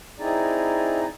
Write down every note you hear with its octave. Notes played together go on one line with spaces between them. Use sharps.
C4 D#4 E4 G#4 D5 A#5